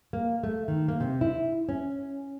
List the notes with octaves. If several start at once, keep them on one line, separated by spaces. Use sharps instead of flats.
A#3
A3
D#3
A#3
C3
E4
C#4